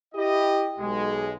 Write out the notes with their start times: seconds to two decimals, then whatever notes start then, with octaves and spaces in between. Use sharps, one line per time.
0.15 E4 G4 D#5
0.79 B1 G#3